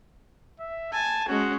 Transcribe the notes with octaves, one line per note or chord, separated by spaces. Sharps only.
E5
G#5 A5
G#3 C#4 F#4